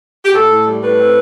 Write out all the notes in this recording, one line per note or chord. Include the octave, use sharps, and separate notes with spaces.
G4
A2 A4
A2
G3
A2 B4
C4